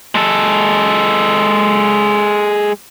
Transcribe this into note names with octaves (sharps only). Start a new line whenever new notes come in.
G#3 A4